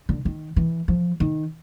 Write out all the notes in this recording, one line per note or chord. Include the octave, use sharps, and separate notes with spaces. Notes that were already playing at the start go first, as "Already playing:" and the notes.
D3
D#3
E3
F3
D#3